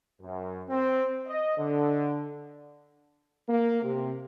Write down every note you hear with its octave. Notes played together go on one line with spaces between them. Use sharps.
F#2
C4
D#5
D3
A#3
C3